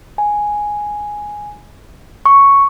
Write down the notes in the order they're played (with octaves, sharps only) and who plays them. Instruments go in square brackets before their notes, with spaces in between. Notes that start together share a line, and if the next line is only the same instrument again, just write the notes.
[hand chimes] G#5
C#6